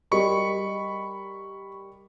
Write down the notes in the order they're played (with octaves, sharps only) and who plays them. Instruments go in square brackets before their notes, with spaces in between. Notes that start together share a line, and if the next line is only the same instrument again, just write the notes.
[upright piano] G3 A#4 D#5 [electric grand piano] B5 C#6 C#7